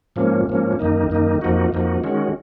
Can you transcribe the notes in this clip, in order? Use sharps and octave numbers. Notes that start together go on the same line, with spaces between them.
G#2 F3 A#3 C#4
G#2 F3 A#3 C#4
F#2 D#3 A#3 D#4
F#2 D#3 A#3 D#4
F2 F3 A#3 D#4 F#4
F2 F3 A#3 D#4 F#4
D#3 G#3 C#4 F#4